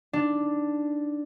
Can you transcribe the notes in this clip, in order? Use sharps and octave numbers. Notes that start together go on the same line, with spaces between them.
D4 D#4